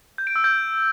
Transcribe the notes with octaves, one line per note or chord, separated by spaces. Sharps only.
G6
D7
E6
G6